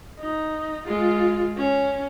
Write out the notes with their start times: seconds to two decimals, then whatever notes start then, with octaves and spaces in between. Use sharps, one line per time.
0.20 D#4
0.86 G#3 F4
1.57 C#4